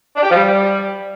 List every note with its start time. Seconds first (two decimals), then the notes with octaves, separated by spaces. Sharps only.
0.17 D4
0.23 G4
0.29 F3
0.36 G3